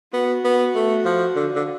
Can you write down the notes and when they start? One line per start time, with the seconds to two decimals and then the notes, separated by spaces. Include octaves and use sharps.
0.13 B3 F#4
0.44 B3
0.75 A3
1.05 F3
1.36 D3
1.55 D3